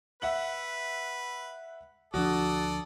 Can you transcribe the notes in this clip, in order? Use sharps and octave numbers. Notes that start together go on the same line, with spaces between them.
B4 E5 F#5 F#7
D2 F3 D4 F#4 A4 D5 D#6